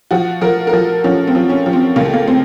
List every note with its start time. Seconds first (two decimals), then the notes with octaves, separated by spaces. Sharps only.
0.11 F3 F#4
0.41 F3 A#4
0.67 A#4
0.73 F3 A4
1.04 F3 C#4
1.27 C4
1.35 F3
1.49 C#4
1.66 F3
1.73 C4
1.96 C#2 A#3
2.05 A3
2.14 A#3
2.28 C4